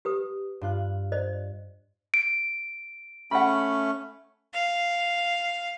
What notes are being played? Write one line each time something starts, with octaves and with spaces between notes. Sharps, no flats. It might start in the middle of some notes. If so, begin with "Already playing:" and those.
G4 B4 D#6
G2 F4 F#6
C5 D5 D#5
D7
A3 C#4 F#5 B5
F5